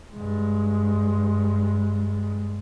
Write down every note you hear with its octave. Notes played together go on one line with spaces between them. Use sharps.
G2 G#3